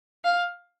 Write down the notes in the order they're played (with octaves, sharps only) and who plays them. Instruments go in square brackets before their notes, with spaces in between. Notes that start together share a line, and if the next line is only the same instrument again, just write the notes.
[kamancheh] F5